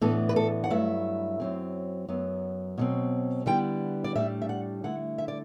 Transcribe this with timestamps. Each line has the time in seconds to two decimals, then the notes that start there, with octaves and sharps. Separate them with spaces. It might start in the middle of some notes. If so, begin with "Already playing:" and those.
0.01 A2 E3 B3 D4 A4
0.29 B4
0.36 A4
0.64 F#5
0.70 G2 F#3 A3 E4 E5
1.40 F#2 F#3 C4
2.08 F#2 F#3 B3
2.78 B2 F#3 C4
3.46 D3 G3 B3 E4 G5
4.04 D5
4.15 A2 G3 D4 E5
4.42 E5
4.49 F#5
4.84 D3 A3 E4 F#5
5.18 E5
5.28 D5